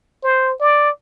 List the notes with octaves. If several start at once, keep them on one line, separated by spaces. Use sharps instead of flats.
C5
D5